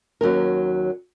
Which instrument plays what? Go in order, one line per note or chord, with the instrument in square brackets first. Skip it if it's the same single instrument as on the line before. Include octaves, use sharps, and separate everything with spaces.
[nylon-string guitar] D#2 F#3 C#4 A#4